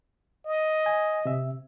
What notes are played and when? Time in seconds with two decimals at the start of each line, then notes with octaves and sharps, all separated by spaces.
0.46 D#5
0.86 G#5
1.25 C3 E5